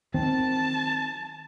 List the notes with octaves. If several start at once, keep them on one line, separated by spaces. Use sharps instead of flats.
D#3 C4 A5